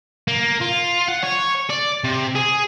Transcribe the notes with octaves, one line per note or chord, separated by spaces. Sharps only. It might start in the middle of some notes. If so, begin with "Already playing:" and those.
A#3
F4
F#5
C#5
D5
C3
G#4